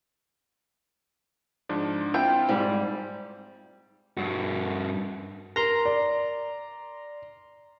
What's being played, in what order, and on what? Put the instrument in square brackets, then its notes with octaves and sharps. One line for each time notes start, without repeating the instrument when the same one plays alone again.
[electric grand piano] G#2 F3 D4
[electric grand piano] C4 E4 F4 [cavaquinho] G5
[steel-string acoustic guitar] G#2 G3
[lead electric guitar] G2 F#4
[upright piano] A#4 [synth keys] A#5 C6
[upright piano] D5